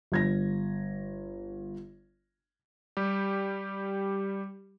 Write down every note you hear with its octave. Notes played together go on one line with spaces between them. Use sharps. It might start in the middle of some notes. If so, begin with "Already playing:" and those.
G1 G#6 A#6
G3 G4